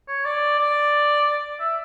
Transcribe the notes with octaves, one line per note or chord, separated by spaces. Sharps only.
C#5
D5
D5
E5